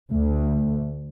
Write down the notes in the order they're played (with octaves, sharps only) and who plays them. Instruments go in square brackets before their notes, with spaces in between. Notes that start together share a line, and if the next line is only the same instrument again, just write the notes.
[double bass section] D2 [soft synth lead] A3